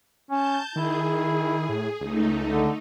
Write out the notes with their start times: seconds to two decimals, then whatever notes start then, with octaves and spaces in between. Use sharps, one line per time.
0.30 C#4 A5 G6
0.76 D#3 E4 G#4
1.69 A2
2.01 C#2 A3 D#4
2.49 D3